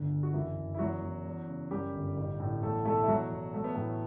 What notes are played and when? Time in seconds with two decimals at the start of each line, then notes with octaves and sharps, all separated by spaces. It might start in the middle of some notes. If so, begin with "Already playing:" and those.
Already playing: G1 D2 D3
0.11 D2
0.23 F#4
0.33 F#1 E3 E4
0.56 F#1
0.74 E4
0.79 E2 F#3 F#4
1.02 E2
1.25 E2
1.48 C#3
1.71 F#2 G3 G4
1.94 G1
2.17 A1
2.40 A2
2.63 E2 A3 A4
2.85 B2 A3 A4
3.03 E4
3.08 E2 F#3 F#4
3.32 E2
3.54 F#3 A3
3.64 B3
3.75 E2 A2 A3